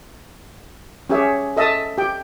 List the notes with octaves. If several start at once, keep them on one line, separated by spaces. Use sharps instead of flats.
C#4 G4 G#4 C#5 E5
A4 D#5 E5 A5 D#6
G4 G5